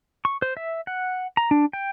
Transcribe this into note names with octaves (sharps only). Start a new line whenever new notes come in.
C#6
C5
E5
F#5
A#5
D4
G5